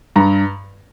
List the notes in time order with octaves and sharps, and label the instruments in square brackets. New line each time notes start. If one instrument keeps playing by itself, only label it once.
[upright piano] G2 A#5